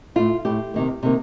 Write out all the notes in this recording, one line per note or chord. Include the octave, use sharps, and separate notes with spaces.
A2 A3 F4
A2 A3 G4
C3 D#3 A#3
C3 D#3 A#3